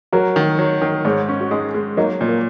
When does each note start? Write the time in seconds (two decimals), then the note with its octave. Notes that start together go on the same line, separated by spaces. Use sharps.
0.12 F#3 F#4 A#4
0.36 D#3
0.59 F#3
0.82 D#3
1.05 G#2 G#4 C#5
1.28 C#4
1.41 F#4
1.51 G#3 D#4 G#4
1.74 G#3
1.97 F#3 A#3 D#4
2.21 A#2
2.28 A#3